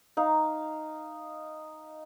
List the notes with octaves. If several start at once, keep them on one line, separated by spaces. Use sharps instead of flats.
D#4 F5